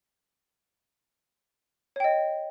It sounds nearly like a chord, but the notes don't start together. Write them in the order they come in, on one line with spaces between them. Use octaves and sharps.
C#5 G5 D#5